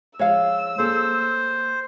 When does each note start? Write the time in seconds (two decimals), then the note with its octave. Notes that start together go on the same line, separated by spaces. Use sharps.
0.19 F3 G#3 C#5 F5 E6
0.78 A#3 G#4 A4 C5